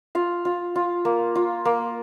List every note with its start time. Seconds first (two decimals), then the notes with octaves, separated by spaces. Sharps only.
0.15 F4 F5
0.45 F4
0.75 F4
1.05 A#3
1.35 F4
1.65 A#3